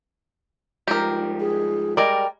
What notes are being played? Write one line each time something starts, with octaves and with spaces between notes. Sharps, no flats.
G#2 F3 G3 G4 A#4
G#4
G3 G#3 A#4 D5 G5